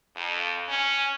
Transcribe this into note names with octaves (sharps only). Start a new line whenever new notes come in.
F2
C#4